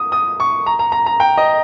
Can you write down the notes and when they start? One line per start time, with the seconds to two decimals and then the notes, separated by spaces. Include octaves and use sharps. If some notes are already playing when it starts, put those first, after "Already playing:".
Already playing: D#6
0.12 D#6
0.40 C#6
0.66 A#5
0.79 A#5
0.92 A#5
1.06 A#5
1.20 G5
1.38 D#5